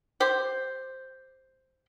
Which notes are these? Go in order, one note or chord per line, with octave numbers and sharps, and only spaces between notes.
G4 C5